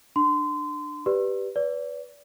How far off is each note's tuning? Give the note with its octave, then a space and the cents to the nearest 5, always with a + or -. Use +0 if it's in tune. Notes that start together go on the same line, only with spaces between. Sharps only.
D4 +20 C6 -25
G4 +0 B4 +0 D5 +0
B4 +0 D5 -35